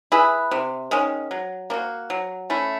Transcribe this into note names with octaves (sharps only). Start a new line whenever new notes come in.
E4 G#4 B4
C3
D#3 G#3 C#4
F#3
A#3 D4 F#4
F#3
A3 C#4 E4